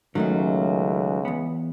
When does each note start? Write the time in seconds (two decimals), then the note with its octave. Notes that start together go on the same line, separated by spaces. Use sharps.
0.15 C#2 D#3 F#3 A3 C#4
1.25 E2 B3